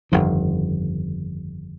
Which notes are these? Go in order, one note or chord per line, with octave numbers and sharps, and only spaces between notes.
G1 F2 D#3